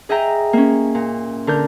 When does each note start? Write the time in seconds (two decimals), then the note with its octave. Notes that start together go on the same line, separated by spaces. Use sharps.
0.09 G#4 D#5 E5 G5 A#5
0.53 A#3 C#4
0.95 A#2
1.47 D3 A#4 G6